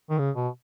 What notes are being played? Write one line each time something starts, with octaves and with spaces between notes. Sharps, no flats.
D#3
C#3
B2